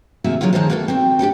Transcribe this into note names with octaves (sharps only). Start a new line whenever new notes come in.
C3 D#3 A#3 F#4 G#4 E5
D3 D#3 F#3 G#3 B3 F4
D#3 G#3 A#4 C5 A5
A#3 B3 F#4 G4 A4
C4 F#4 G5
D4 G4 A4 G5